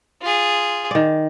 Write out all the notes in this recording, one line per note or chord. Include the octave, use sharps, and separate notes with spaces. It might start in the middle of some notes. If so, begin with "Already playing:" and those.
F4 G#4
D#3 D5